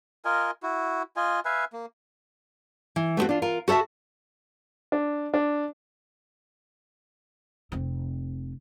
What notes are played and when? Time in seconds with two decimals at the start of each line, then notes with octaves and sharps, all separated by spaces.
0.25 F4 A#4 D#5 G#5
0.63 E4 F#4
1.16 F4 D#5 G#5
1.45 B4 E5 F5 G#5
1.73 A#3
2.96 E3
3.17 A3 B3 C4 F#4
3.29 D4 F4
3.42 F4 A#4
3.68 F#4 A4 C5 E5 A5
4.92 D4
5.34 D4
7.72 F1 C4